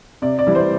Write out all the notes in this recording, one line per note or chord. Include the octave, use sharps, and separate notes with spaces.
C3 D5
D5
E3 G3
C5